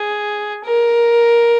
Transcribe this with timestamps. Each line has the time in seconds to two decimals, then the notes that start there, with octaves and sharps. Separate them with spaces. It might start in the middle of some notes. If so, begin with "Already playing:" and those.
Already playing: G#4
0.65 A#4